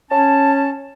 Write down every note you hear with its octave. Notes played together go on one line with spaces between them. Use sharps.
C#4 A5